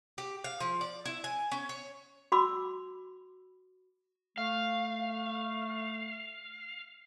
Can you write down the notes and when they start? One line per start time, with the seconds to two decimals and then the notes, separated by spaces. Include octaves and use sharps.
0.18 G4
0.44 F5
0.60 F3
0.81 D5
1.06 E4
1.24 G#5
1.52 C#4
1.69 C#5
2.32 F#4 B5 D6 E6
4.38 A3 F5